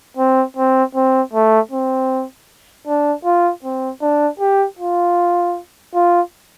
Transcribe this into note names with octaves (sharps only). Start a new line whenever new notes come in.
C4
C4
C4
A3
C4
D4
F4
C4
D4
G4
F4
F4